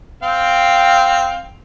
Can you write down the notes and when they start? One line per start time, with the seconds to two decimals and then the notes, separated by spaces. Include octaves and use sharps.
0.23 C4 F5 G5